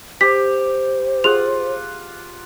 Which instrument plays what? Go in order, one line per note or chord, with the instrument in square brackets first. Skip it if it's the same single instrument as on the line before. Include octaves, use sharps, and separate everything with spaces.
[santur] G4 [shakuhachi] C5 [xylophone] B6
[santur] F4 F#5 [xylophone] G#4 F7